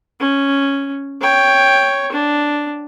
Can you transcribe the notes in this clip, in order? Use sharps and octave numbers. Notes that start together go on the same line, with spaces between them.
C#4
C#5 G5
D4